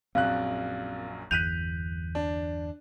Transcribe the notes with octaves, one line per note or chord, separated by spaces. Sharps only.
A#1 F#2 C4 F5 F#6
G1 E2 F#6 G6 B6 D#7 F7
D4